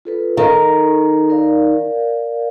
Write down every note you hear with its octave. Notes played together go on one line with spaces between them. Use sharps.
F4 A4 B4
D#3 A4
A#4 D5 F5